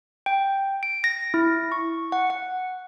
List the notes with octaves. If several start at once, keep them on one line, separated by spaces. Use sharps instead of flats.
G5
D7
A#6
E4
C#6
F#5
F#5